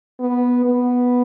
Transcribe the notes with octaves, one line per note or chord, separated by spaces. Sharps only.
B3
B3